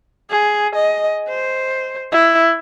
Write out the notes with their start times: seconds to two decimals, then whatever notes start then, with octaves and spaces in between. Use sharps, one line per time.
0.30 G#4
0.75 D#5
1.29 C5
2.12 E4